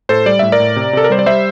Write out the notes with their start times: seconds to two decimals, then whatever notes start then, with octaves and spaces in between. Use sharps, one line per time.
0.09 A2 A4 C5
0.26 G3 D5
0.39 A2 E5
0.52 A#4 D5
0.60 A2
0.76 C3
0.93 C3 A4
1.04 A#4
1.10 G3 C5
1.19 D5
1.26 G3 C5 E5